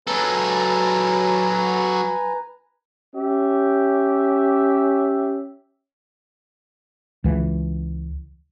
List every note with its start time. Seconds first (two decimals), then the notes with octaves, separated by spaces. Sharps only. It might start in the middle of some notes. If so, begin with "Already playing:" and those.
0.08 F#3 A4 B4 G#5 A#5
3.15 C#4 G4 E5
7.24 C#2 E3